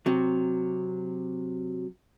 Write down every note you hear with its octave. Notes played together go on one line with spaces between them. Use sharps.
C3 F#3